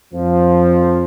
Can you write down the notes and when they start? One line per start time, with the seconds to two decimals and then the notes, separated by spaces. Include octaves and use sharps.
0.14 F2 F3